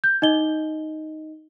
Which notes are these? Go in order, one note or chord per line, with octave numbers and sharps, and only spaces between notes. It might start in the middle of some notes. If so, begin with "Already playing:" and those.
G6
D#4 D#5 G7